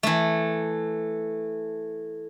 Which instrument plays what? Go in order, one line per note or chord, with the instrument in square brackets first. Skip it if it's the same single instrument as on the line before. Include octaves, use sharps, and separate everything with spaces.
[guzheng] E3 A3